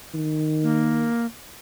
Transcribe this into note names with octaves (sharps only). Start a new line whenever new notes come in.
D#3
A#3